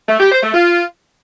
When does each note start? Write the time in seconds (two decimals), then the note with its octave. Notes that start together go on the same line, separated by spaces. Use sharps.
0.09 A3
0.20 G4
0.32 C5
0.43 A3
0.54 F4